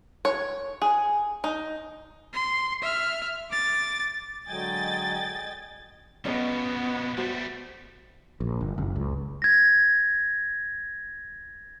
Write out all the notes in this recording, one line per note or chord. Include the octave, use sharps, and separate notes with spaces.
C#5
G#4
D#4
C6
E5 F6
D6 A6
D3 F#3 G#3 D#5 G5 G#5 A6
B2 F3 B3 C#4 C#5 D#5
G3 A3 F#4 C5
A#1
G1
F#1
C#2
G#6 A#6